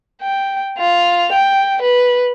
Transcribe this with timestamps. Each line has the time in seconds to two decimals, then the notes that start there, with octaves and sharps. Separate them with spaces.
0.21 G5
0.78 F4 F7
1.32 G5
1.82 B4